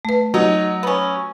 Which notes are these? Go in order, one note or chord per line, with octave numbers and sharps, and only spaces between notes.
A3 B4
F#3 D#4
B3 C#4